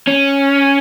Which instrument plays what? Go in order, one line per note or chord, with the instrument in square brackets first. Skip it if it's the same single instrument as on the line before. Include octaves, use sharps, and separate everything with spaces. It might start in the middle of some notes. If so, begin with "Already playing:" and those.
[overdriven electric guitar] C#4